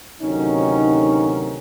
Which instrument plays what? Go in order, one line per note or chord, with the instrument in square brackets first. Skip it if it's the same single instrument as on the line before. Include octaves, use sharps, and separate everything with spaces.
[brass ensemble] D2 C3 D#3 F#3 C#4 D#4